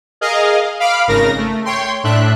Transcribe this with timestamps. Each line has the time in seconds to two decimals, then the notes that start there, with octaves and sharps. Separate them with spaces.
0.21 G#4 A#4 D#5 F5
0.79 F5 B5 D6 F6
1.08 G#1 C#3 A#4 A#6
1.37 A3
1.65 C#5 G5 C6
2.03 A2 D4 E5 F#6